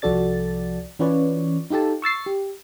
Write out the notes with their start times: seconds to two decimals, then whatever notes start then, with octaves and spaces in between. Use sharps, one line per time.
0.02 C2 F3 F#4 A4 D5 A6
0.99 E3 C#4 F4 B4 C#5 D5
1.70 D#4 F4 G4 A4 A5
2.02 C#6 E6 A6 C7
2.26 G4